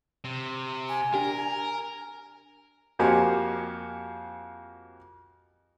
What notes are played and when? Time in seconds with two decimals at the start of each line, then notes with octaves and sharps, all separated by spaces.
0.24 C3
0.89 G#5
1.14 D4 G4 A#4
2.99 F2 A#3 F#4 G4 C5 G#5